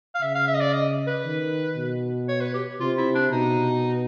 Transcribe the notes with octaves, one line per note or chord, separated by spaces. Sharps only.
F5
C#3 E5
F5
E5
D#5
D5
D#5
B4
D#3
B2
C#5
B4
G4
C3 F4
E4
D4
B2 D#4